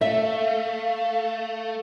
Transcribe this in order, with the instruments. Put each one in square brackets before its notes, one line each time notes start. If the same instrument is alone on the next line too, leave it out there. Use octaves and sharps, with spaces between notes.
[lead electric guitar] A3 [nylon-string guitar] E5 [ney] F5